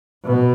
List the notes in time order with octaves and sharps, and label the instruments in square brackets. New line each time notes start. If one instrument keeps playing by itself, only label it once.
[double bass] B2